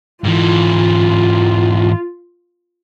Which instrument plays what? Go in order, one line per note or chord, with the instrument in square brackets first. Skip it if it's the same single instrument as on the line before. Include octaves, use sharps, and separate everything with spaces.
[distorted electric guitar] G#2 E3 [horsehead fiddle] F4